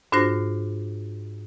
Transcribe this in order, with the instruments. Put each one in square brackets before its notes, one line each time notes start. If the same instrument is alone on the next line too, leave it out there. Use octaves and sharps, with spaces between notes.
[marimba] G#2 D4 F4 F#4 C5 A#6